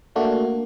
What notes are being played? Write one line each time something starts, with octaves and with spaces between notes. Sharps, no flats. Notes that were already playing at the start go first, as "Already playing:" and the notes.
A3 A#3 D4 F#4